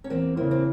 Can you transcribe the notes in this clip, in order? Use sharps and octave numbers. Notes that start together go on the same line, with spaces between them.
C#4
E2 A#3 C4
C#3 E3 A#3 C4
C4